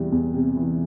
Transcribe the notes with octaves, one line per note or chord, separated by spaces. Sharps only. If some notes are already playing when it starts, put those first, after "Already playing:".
Already playing: E2 C3 E3 G3
E2
C3
E3